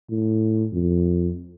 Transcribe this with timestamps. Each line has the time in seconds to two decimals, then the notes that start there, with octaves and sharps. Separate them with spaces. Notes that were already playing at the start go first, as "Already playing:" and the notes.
0.11 A2
0.73 F2